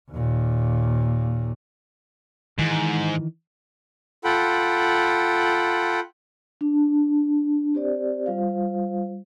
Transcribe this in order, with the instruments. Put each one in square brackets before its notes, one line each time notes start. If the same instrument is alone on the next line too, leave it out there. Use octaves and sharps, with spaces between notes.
[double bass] D#2 A#2
[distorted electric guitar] G#2 [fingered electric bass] D#3 E3
[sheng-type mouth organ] F4 A4 F#5 G5 B5
[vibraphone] D4
C4 G4 C5 D5
G3 F4 C5 F5